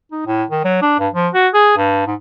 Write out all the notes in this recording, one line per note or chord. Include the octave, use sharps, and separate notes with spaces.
D#4
A2
D#3
F#3
D4
G2
F3
F#4
G#4
G2
G#2